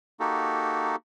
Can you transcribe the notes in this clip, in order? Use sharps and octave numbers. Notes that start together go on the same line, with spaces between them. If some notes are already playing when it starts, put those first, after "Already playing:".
A#3 D#4 F#4 G4 A4